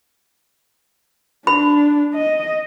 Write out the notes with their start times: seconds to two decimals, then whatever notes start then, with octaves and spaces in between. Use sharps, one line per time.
1.47 D4 B5
2.14 D#5